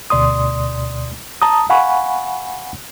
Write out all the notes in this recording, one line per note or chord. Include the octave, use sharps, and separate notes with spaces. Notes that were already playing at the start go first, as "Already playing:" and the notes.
D2 B2 D5 C6 D#6
A5 A#5 D#6
F5 F#5 G#5 B5 C#6